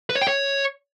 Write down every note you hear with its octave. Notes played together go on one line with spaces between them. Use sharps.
B4
C#5
G5
C#5